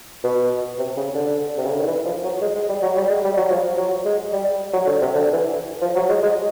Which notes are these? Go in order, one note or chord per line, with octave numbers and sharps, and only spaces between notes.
B2
C3
C#3
D3
C3
C#3
D3
D#3
E3
F3
F#3
G#3
G#3
G3
F#3
G3
G#3
G3
F#3
F3
F#3
G#3
G3
F#3
D3
C3
D3
E3
F3
F#3
G#3
G#3